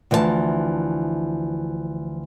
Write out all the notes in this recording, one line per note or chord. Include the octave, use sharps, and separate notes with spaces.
D2 E3 F3 D#5 A5